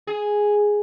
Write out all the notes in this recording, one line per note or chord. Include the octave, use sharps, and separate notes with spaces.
G#4